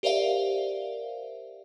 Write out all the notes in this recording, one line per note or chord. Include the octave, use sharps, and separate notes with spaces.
G4 A#4 C5 D5 E5 F5